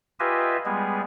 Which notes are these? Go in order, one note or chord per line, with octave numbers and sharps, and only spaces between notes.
F4 G4 B4 D#5 E5 G#5
G3 G#3 B3 G#4